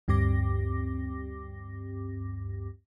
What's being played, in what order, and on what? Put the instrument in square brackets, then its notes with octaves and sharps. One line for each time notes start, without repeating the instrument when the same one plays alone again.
[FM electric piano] D2 G2 C4 G4 D6 A#6